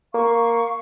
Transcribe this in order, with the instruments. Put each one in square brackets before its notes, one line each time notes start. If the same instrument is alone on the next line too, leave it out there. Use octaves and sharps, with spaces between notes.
[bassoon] A#3 [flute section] F5 C#6